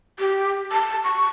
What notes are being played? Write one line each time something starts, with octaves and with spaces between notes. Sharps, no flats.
G4
A5
C#6